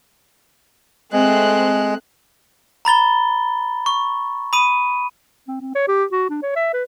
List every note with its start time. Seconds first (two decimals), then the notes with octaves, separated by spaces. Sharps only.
1.13 G#3 A3 C4 F#6
2.85 A#5 B5 A6 G7
3.86 C#6
4.53 B5 D#6 D#7
5.48 C4
5.61 C4
5.75 C#5
5.88 G4
6.12 F#4
6.30 D4
6.43 C#5
6.56 E5
6.73 B4